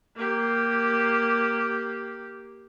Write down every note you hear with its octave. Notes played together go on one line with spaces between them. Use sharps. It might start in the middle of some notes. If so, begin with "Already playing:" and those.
A#3 G4